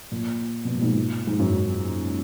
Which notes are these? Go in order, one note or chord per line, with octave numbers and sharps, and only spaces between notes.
A#2
B2
A#2
G#2
A#2
G#2
F#2